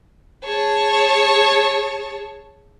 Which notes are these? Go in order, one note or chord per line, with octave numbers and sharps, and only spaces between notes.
G#4 C#5 A5